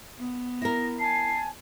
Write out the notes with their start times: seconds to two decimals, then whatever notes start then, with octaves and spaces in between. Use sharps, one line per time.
0.19 B3
0.62 E4 A#4 A#6
0.99 G#5 A5 C7